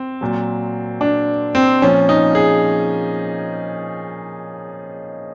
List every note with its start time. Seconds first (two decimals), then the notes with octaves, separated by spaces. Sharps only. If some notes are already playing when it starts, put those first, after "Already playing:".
Already playing: C4
0.21 A#2 F#3
1.01 D4
1.55 C4
1.82 A#2 F3 C#4
2.09 D#4
2.35 G#4